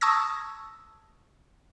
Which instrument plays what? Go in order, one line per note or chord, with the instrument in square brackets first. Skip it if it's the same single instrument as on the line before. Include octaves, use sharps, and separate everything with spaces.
[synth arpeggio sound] A5 C#6 D#6 E6 G#6 A#6